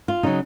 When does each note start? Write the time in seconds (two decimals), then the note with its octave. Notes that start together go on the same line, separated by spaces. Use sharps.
0.08 F4
0.23 C#3 F#3 D#4